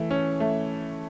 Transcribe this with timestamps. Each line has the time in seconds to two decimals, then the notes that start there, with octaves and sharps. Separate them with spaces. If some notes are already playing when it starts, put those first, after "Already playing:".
Already playing: E3 A3
0.11 C#4
0.40 A3